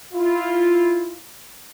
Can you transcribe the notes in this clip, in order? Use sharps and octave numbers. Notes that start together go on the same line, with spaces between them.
E4 F4